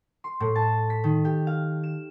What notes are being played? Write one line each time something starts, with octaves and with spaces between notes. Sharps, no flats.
C6
A2
A5
B6
D#3
G4
F5
E7